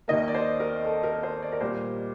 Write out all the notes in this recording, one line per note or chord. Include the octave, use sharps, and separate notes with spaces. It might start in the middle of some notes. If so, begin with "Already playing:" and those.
D#2 D#3 A#3 D#5
D5
C5
A#4
A4
A#4
C5
D5
A#4
A#2 G3 A#3 C5